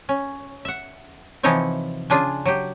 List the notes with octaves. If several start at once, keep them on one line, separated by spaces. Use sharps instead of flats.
C#4
E5 F#5
C3 E3 F3 D#4 E4 C#5
C#3 D4 F4 G#4
F#3 G4